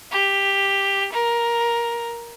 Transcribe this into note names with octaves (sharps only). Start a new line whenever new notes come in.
G4
A#4